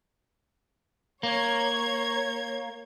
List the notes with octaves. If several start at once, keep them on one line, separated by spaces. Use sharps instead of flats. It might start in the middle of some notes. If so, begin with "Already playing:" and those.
A#3 C#5 G#6